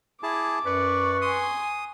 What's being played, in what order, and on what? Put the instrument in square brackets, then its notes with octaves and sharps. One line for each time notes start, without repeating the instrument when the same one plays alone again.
[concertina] E4 G#4 A5 [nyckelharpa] D6
[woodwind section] F#2 B4 C#6 [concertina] D5
[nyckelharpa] G#5 C6 [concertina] D#6